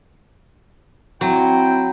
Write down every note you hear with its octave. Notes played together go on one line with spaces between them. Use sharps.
F#3 C4 E4 G5